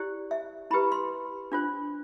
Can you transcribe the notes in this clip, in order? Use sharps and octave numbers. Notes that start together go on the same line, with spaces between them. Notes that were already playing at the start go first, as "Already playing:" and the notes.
Already playing: E4 G4 C5 D5
E5
E4 G4 B4 B5
C6
D4 F4 C5